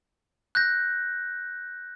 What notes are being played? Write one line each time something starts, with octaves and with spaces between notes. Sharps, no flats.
F#6 G6 A#6